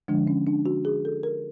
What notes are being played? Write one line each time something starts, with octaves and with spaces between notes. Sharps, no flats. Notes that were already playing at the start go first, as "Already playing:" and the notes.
D3 F3 G#3 D4
C#4
D4
F#4
G#4
A4
A#4